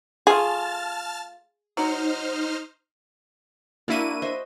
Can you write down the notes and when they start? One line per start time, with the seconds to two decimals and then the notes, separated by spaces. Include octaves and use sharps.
0.27 A3 F4 G#4 A5 F6 A6
1.77 F#3 D#4 C5 F6
3.88 A#3 D4 E4 F#4 D#7
4.22 C5 D#5 E5